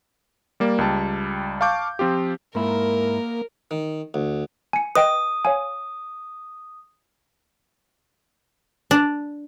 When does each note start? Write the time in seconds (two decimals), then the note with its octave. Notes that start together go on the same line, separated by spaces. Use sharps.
0.60 G3 A#3 D5
0.78 C#2 G3 A5
1.61 F5 A5 C#6 D6 G6
1.99 F3 C4 F4 G4
2.55 G#2 A#3 E4 A#4
3.71 D#3
4.14 D2
4.73 G#5 C#7
4.95 B4 D#5 G5 D#6
5.45 C#5 F5 G#5
8.91 D4